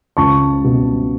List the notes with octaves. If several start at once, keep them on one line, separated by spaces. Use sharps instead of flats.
C#2 A5 C#6
B2